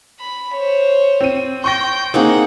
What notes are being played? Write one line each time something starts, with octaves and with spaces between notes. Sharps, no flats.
B5
C5 C#5
C4 D#7
G5 C6 C#6 G6 A#6
A#3 C4 D#4 G#4 F#5